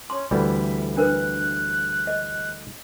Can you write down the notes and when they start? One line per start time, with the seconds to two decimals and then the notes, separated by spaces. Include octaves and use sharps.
0.10 C#4 C6
0.31 D2 E3 G3 E5
0.97 D4 A#4 B4 F#6
2.07 D#5